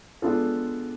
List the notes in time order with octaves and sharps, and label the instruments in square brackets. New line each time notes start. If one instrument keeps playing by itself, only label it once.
[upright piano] G#3 B3 D4 F4 A4